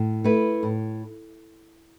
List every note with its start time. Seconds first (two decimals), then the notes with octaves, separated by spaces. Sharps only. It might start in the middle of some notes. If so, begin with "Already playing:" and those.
Already playing: A2
0.24 A3 E4 B4
0.63 A2